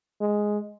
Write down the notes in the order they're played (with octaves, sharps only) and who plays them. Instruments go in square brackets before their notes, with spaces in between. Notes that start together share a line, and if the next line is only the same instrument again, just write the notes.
[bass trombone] G#3